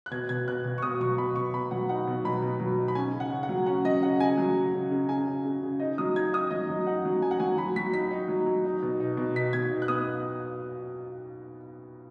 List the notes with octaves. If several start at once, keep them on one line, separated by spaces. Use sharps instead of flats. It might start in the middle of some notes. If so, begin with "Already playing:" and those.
F#6
B2 G#6
B2 G#6
B2 F#6
B2
C#6
B2 D#6
F#3 C#6
B2 B5
B2 C#6
B2 B5
F#3 F#5
D#4 F#5
B2
F#3 B5
B2
F#3
D#4
B5
C#4 G#5
C#3
F#5
C#3
F#5
F#3
C#4 F#5
F#3 D#5
C#3 F#5
C#3 G#5
F#3
C#3
C#3
C#3
C#3 G#5
C#3
C#3
C#3
D#4 D#5
F#3 D#6
D#4 G#6
D#4 D#6
F#3 D#5
F#3
D#4 F#5
F#3
D#4 G#5
F#5
F#3 G#5
F#3 B5
F#3 B6
D#4 B6
D#4
F#3
F#3
D#4
B2
D#4
B2
D#4 B6
B2 G#6
D#4
F#6
B3 D#6